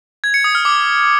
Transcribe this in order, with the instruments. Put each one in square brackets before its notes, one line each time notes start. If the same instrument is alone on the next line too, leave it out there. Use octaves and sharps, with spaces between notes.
[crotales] G#6
C#7
D#6
F6
D6